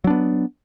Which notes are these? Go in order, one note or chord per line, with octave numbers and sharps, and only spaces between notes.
F#3 B3 D4